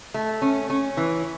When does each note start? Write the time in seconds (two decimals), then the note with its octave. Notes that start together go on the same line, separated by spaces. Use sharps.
0.14 A3
0.42 C#4
0.70 C#4
0.97 E3